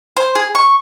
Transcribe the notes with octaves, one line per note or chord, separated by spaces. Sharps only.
C5
G#4
C#6